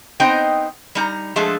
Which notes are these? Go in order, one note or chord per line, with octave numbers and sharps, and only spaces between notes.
B3 C4 D#4 C5 D#5 G5
G3 D#4 A#5
F3 G#3 A3 D4 G#4 A4